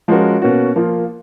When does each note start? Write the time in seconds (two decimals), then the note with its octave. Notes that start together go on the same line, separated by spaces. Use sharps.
0.08 F3 G#3 C#4 F#4 A#4
0.42 B2 A#3 C#4 F#4
0.76 F3 A#3 F4